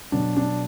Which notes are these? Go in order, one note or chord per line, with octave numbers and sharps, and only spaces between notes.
B2 F#3 D4
D4